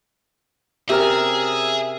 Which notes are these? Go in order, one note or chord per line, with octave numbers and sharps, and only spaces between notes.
C3 C#4 G4 G#4 A#4 E5 G#5 F6